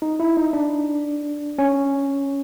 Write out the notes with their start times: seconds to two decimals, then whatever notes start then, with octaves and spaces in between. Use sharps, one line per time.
0.02 D#4
0.20 E4
0.37 D#4
0.53 D4
1.59 C#4